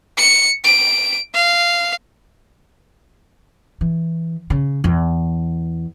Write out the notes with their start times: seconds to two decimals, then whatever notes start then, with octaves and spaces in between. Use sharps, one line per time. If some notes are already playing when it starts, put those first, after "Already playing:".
0.18 C#7
0.64 D7
1.35 F5
3.81 E3
4.50 C#3
4.84 E2